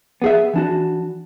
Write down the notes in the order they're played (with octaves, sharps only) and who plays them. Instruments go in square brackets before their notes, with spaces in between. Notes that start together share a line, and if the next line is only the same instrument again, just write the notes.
[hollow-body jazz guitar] B3 G#4 E5
E3 D4 F#4